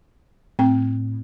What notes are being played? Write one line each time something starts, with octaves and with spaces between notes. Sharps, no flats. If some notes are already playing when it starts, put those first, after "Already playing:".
A2 C4 G5